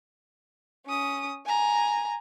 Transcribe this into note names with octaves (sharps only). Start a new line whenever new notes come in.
C#4 D#6
G#5 A#5